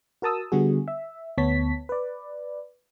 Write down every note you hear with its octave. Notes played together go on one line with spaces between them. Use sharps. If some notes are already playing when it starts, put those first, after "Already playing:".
F#4 A#4 A5 D#6 E6
D3 G3 B3 F#4 G#4
E5
D2 B3 C#5 A5 B6
B4 D5